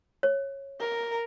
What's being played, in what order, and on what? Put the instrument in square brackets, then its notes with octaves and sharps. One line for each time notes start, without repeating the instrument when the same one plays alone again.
[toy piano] C#5
[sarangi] A#4